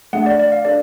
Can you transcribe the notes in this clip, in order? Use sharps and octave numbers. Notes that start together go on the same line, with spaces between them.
A3 D4 G#4 F#5
D5
D5
F5
D4 F#4 A4 D5